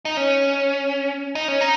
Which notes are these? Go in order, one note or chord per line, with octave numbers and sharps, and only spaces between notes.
D#4
C#4
D#4
C#4
D#4